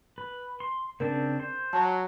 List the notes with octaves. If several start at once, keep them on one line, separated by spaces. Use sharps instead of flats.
B4
C6
C#3 C4 D4 A#4
C5
F#3 A5